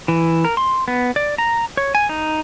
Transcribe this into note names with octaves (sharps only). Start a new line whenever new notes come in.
E3
A#4
C6
B3
D5
A#5
C#5
G#5
D#4